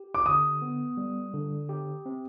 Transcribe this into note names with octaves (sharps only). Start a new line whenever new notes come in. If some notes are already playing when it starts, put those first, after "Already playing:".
Already playing: G4
D6
D3 D#6
B3
G3
D3
G4
C4